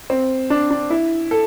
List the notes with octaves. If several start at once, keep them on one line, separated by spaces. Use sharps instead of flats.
C4
D4
D4
E4
A4